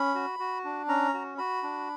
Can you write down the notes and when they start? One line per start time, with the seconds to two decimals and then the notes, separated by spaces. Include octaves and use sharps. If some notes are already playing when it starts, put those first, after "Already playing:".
Already playing: C#4 B5
0.14 F#4
0.39 F#4
0.64 D4
0.88 C#4 A#5
1.14 F#4
1.38 F#4 B5
1.63 D4